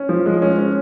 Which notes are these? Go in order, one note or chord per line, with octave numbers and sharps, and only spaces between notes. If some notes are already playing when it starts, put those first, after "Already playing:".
Already playing: C#4
F3
G#3
C#4
C#4